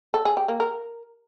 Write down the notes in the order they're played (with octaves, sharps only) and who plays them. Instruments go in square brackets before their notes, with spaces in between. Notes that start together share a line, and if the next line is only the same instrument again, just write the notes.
[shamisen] A4
G#4
G4
A#3
A#4